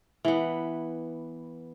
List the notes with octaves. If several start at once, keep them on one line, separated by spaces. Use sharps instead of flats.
E3 B3